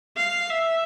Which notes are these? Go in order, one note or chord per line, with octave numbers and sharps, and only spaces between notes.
F5
E5